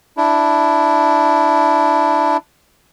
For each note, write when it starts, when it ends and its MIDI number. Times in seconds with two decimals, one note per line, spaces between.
0.17 2.37 62
0.17 2.37 64